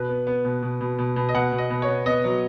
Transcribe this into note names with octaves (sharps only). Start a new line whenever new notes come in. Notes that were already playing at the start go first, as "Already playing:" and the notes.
Already playing: B2 B4
B3
B3
B2
B2
B2
B2
B2
D#5
B2 F#5
B2
D#5
B2
C#5
B3
B3 D#5
F#3